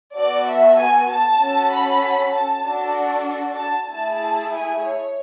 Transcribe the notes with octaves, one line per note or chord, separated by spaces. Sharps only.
B3 F#4 A4 D5
E5
G#5
A5
C#4 F#4 A4
B5
A5
D4 F#4 A4
A5
A3 E4 G#4 A5
G#5
C#5